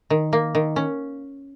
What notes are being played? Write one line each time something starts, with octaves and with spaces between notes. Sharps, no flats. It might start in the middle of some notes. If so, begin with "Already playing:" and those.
D#3
A#3
D#3
C#4